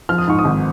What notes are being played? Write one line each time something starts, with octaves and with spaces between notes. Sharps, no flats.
F3 F6
D#6
G#2 C#6
D#6
G#1